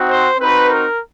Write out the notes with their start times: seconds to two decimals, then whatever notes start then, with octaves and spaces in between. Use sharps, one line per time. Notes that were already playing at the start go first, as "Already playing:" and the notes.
Already playing: C4 D#4 F#4
0.09 C5
0.39 C4 D#4 F#4 B4
0.68 A#4